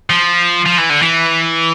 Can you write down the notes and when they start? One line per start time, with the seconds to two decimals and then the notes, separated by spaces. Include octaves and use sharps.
0.10 F3
0.66 F3
0.78 E3
0.90 D3
1.02 E3